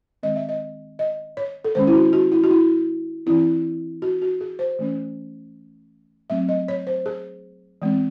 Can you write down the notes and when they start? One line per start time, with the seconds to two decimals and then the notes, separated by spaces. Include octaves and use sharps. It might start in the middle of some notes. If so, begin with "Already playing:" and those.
0.23 D#3 G#3 C4 D#5
0.36 E5
0.49 D#5
0.99 D#5
1.37 C#5
1.64 A4
1.75 D#3 G#3 C#4 C5
1.87 E4
1.94 F#4
2.13 F#4
2.32 E4
2.44 F#4
2.51 E4
3.26 E3 C4 E4
4.02 F#4
4.22 F#4
4.41 G#4
4.59 C5
4.79 E3 A3 C#4
6.30 F#3 A3 C4 E5
6.49 D#5
6.68 C#5
6.87 C5
7.06 G#4
7.82 E3 G#3 C4